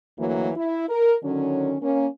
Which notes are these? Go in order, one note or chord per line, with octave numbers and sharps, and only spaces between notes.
D2 E3 F#3 A#3
E4
A#4
D3 D#3 F#3 C#4
A#3 C#4